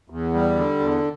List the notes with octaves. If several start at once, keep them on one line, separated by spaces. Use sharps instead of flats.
E2
G3
D3
E2